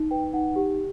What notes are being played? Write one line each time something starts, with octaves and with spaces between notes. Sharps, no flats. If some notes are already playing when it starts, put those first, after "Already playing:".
Already playing: D#4
B4 G5
D#4 F#5
G4